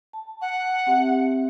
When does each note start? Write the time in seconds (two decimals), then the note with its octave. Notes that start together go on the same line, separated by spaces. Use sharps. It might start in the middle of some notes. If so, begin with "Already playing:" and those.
0.13 A5
0.41 F#5
0.87 C4 G4 E5